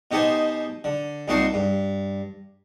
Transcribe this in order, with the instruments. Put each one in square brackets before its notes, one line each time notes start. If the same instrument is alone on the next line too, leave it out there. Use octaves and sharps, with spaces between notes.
[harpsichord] B2 D#4 G4 A4 C5 G#5
D3
C2 A#2 D#4 F#4 A5 C6
G2